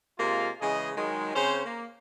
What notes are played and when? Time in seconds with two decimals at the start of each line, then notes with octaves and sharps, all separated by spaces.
0.19 C3 G#3 A#3 F4
0.61 C#3 E3 G#3 G#4 D#5
0.96 D#3 F#3 G#3
1.35 C#3 C4 C#4 C5
1.65 A#3